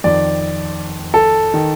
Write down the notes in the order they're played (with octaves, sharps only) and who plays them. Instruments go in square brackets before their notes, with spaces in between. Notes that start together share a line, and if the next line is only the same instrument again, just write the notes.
[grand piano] F2 D#3 D5
A4
D#3